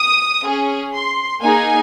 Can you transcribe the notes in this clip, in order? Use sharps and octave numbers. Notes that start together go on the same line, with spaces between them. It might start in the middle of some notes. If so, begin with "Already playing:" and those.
Already playing: D#6
C#4 G#4
C6
A#3 D#4 G#4 G#5